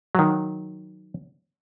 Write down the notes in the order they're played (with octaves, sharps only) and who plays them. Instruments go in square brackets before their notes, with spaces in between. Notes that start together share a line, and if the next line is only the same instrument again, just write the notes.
[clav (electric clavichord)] D#3 F#3